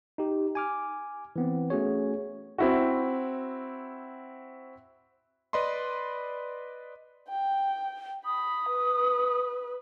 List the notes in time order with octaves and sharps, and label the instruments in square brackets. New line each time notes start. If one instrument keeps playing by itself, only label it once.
[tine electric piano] D#4 G4
G#5 D6 F6
E3 B3 C4
A3 C#4 F#4 G#4 C#5
[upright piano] C4 E4 F#4
[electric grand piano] B4 D5 D#5 B5 C6
[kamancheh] G5
[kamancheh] B5 [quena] D#6
[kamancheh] B4